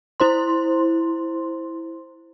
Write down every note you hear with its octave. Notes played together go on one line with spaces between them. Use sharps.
E4 C5 C6